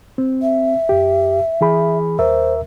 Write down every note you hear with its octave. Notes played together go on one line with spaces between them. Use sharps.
C4
E5
F#2 G4
E3 G#4 B5
D#2 A#4 C5 E5